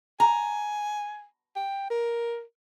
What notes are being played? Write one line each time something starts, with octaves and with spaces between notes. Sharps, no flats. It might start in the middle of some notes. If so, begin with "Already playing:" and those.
G#5 A#5
G5
A#4